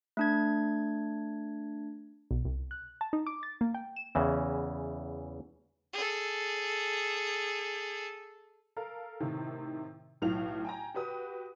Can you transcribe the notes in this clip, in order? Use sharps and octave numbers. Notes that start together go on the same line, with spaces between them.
A3 D4 G#6
B1
C2
F#6
A5
D#4
D6
A6
A#3
G5
E7
E2 C#3 E3
G#4 A4
A4 A#4 F5
A2 C3 D#3
B1 A2 E3 F4 F5 F7
G5 G#5 A#5
F#4 G4 B4 D#6